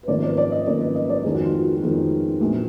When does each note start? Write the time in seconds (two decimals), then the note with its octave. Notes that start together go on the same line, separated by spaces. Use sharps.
0.03 B4
0.08 G#1 F#2 F3 A#3 D5
0.23 D5
0.29 B4
0.37 D5
0.52 D#5
0.66 G#1 F#2 F3 A#3 D5
0.81 B4
0.95 D#5
1.09 D5
1.24 F2 D#3 G#3 B3 G#4
1.34 F#4
1.45 F4
1.54 F#4
1.77 F#4
1.82 F2 D#3 G#3 B3 F4
2.41 A#1 A#2 F#3 B3